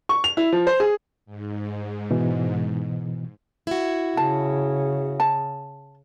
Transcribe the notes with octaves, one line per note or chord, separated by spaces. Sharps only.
C#6
F7
E4
F3
C5
G#4
G#2
B2 E3
E4 F#4
C#3 A5
A5